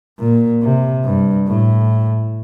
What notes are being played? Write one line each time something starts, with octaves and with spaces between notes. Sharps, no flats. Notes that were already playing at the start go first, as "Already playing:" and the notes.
A#2
C3
G2
A2